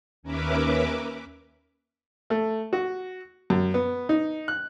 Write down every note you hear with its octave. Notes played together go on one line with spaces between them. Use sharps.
D#2 C#4 A#4 B4 E5 D6
A3
F#4
F#2
B3
D#4
F#6